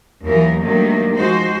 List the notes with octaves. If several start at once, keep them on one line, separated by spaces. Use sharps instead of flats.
D#2 E3 F#3 A#4
D#3 F#3 G3 A3 A#3 D4
F3 G#3 D#4 F#4 C5